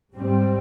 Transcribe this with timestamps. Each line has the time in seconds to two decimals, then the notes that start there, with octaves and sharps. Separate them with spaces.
0.15 G#2 G3 C4